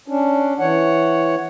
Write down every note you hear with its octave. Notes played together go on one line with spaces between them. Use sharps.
C#4 D4
E3 C#5 F#5